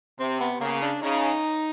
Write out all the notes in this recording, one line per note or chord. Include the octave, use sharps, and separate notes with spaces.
C3 C4
B3
C#3 A#3
D4
C#3 D#4